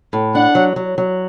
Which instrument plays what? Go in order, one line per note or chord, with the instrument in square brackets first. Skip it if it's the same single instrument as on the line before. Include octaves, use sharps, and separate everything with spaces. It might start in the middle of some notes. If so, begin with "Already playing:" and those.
[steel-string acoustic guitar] A2
[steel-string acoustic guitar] D4 [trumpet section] F#5
[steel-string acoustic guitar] F#3
F#3
F#3